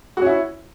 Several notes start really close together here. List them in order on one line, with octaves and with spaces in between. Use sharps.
F#4 C#4 E4